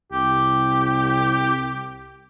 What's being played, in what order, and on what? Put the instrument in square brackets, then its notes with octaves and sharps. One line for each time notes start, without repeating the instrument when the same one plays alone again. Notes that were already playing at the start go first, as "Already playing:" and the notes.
[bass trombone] C2 [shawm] G4